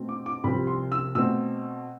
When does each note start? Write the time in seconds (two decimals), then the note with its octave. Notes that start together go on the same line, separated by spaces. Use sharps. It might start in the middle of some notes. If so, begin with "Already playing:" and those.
Already playing: B2 A3 C4
0.09 D6
0.26 D6
0.44 C2 C3 F3 C4 B5
0.67 C6
0.92 E6
1.15 B2 A3 C4 E6